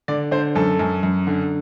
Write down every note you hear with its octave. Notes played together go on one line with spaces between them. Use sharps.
D3 D5
D3 C5
F#2 A4
F#2
F#2
D3